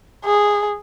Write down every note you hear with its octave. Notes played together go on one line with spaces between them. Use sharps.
G#4